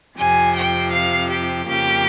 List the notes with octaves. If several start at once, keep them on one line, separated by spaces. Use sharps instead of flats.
F2 C3 F3 G#5
G5
F5
G4
F2 C#3 F3 A#3 G4